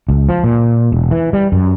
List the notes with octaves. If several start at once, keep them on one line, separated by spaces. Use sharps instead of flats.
C#2
F3
A#2
E1
E3
G3
F#2